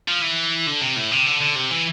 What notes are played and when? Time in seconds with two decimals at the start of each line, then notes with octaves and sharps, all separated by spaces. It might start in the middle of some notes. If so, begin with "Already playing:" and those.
0.08 F3
0.22 E3
0.67 D3
0.81 C3
0.96 A2
1.12 C3
1.26 D3
1.41 D3
1.56 C3
1.71 E3